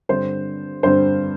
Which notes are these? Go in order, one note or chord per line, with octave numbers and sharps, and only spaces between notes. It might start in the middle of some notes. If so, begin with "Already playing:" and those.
G2 D3 G3 C4 C5
G2 D3 G3 C4 C5